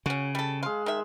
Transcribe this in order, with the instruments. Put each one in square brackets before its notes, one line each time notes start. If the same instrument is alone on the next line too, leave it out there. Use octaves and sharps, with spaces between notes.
[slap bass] C#3 [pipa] C#4 F#4
[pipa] G3 A4
[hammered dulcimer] G#3 C6 [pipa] F5
[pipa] D#3 E5